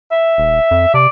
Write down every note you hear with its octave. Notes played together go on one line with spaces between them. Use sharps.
E5
D#1
F2
C3 D5